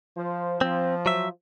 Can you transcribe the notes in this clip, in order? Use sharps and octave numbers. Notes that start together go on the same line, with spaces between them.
F3 C5
F3 C4
F#3 E5